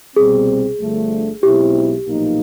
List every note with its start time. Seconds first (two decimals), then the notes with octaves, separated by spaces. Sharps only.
0.16 C2 B2 G3 C4 G#4
0.80 G1 G2 D3 F3 A3
1.43 B1 B2 G#3 C4 E4 G4
2.07 B1 A#2 F3 A#3 D#4